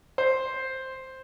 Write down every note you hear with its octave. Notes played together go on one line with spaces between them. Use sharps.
C5